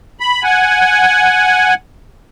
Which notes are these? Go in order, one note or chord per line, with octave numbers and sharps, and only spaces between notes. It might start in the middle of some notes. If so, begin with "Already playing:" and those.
B5
F#5 G#5